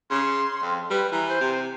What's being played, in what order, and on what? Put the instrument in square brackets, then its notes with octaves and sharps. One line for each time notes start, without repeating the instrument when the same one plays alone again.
[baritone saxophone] C#3 [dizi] C6
[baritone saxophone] F2
[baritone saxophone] G3 [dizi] B4
[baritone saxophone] E3 [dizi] A#5
[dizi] C5
[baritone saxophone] C3